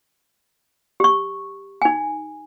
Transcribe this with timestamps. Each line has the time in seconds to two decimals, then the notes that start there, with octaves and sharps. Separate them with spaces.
1.00 G4 C#6
1.82 D#4 G#5